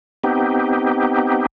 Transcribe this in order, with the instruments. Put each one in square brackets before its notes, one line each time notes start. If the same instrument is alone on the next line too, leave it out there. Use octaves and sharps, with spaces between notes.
[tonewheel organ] B3 C4 D#4 G4